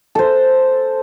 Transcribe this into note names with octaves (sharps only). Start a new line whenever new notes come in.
A4 C5